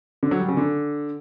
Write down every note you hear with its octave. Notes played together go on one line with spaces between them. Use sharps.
D3
F#3
G3
C#3
D3